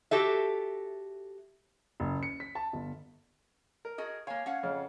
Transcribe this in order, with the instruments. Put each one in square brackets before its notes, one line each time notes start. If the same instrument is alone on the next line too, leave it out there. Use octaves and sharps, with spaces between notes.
[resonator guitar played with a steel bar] F#4 G4 A4 E5
[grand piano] F#1
C#7
B6
A5
G1
[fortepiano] A#4
[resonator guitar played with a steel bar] F#4 G#4 D#5
[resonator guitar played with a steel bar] A#3 F5 [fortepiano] C#5 G#5
[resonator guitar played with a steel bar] C#4 F5 F#5
[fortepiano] F2 F6 [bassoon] C#3